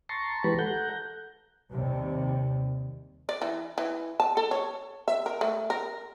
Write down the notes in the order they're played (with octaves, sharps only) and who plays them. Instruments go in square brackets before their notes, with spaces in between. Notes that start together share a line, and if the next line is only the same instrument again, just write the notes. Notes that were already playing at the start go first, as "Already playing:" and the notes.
[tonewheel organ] A5 A#5 C6 C#6
E3 G#3 G4 B4 B5 C#6
A4 F#5 A#5 G6
[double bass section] D#2 C3 G3
[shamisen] D5
E3
E3
A5
A4
C#5
E5
A#4
A3
A#4